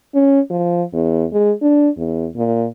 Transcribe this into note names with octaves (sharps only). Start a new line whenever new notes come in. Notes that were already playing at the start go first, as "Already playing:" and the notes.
C#4
F3
E2
G#3
D4
E2
A#2